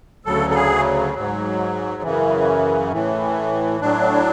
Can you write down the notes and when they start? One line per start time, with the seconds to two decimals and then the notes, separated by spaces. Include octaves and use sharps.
0.25 D2 C#3 F#3 A4
0.50 A4
0.55 G#4
1.14 G#2 F#3
2.02 F#2 C#3 E3
2.92 A2 E3
3.81 A2 F#3 D4